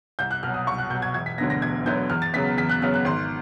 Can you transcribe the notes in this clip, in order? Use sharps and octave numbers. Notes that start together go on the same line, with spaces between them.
C2 G6
F#6
B2 F#3 F6
D#6
C2 C#6
F#6
B2 F#3 G6
G#6
E1 G#6
B6
D2 D3 F#3 B3 A#6
A#6
E1 G#6
D2 D3 F#3 B3 G6
E2 F6
A6
C#3 F#3 B3 B6
E2 B6
F#6
C#3 F#3 B3 F6
F#6
G#1 C6